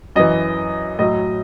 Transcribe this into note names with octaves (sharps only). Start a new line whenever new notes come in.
F#2 E3 D#5
A2 F#3 D#5